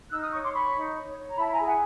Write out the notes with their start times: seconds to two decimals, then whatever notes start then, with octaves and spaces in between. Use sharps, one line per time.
0.10 D#4 E6 F#6
0.21 D#6 F6
0.31 C#5 C#6 D#6
0.42 C6 D6
0.53 C#5 B5 C#6
0.74 D#4
0.95 C#5
1.16 C#5
1.28 A#5
1.37 E4 A5 B5
1.51 G#5 A#5
1.58 G#4
1.65 F#5 G#5